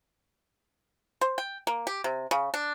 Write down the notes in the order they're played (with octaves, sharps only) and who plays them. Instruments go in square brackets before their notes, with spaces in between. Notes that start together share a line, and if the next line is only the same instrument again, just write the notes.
[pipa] C5
G5
A#3
G4
C3
C#3
D4